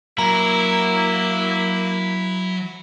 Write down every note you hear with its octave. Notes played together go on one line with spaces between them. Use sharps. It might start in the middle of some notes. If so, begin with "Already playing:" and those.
F#3 A#3 E4 A#5